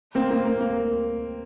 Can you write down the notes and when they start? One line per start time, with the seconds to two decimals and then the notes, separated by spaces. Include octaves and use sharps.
0.15 A#3 C4
0.31 A#3 C4
0.46 A#3
0.61 A#3